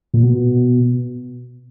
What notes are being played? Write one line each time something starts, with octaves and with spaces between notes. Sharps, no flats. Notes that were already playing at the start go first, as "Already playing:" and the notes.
A#2
B2